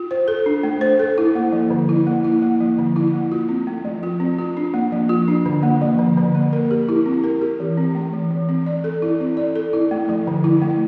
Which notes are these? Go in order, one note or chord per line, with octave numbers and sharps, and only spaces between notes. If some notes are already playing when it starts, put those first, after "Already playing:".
Already playing: F4
C5
A4
D4
A3
C5
A4
E4
A#3
F3
D3
E4
A#3
E4
A#3
F3
D3
E4
A#3
F4
C4
A3
F3
F4
C4
F4
D4
A#3
F3
F4
D4
D3
A#3
F3
D3
D3
A#3
A#4
G4
E4
C4
A#4
G4
E3
C4
A3
E3
E3
C4
D5
A4
E4
C4
D5
A4
E4
A3
F3
D3
E4
A3